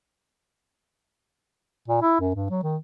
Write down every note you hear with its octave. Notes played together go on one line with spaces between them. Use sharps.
A#2
E4
F#2
G2
F#3
D#3